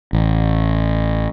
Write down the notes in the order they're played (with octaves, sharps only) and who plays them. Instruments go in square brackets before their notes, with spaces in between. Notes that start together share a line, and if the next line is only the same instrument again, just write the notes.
[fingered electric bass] A1